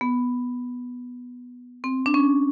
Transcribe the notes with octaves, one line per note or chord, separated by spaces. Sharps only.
B3
C4
D4
C#4